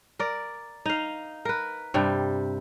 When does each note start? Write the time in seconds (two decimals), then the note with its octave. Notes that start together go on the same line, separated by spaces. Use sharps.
0.19 A#4 D5
0.86 D#4 F5
1.45 A#4 B4
1.94 G2 C3 G3